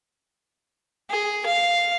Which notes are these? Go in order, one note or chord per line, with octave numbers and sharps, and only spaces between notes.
G#4
F5